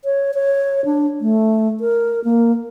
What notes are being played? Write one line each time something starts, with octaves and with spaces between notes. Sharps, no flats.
C#5
C#5
D4
A3
A#4
A#3